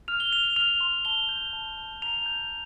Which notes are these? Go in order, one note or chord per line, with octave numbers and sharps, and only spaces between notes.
F6 F7
G7
F6 F7
F6 F7
C6
A5 G7
G6
A5
A5
A#5 F7
G6